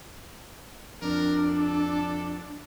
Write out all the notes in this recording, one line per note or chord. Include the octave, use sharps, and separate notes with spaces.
F2 D4 A#4
A4